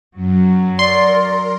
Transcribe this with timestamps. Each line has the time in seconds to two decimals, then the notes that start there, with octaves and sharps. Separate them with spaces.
0.15 F#2 F#3
0.79 A#4 D5 C6